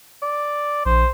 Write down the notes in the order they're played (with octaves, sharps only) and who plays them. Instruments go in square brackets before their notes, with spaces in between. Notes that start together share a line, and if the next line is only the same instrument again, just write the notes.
[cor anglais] D5
[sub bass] A#1 [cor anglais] C5